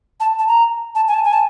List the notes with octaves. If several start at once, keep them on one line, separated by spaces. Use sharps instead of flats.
A5
A5
A#5
A5
G#5
A5
G#5
A5